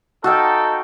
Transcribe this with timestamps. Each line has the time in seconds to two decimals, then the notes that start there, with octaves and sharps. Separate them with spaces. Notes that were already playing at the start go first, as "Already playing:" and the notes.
0.24 D#4 F#4 A4 F5 G5